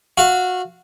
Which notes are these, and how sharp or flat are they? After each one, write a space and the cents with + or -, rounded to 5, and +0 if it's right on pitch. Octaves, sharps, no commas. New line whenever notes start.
F#4 -20 F5 -20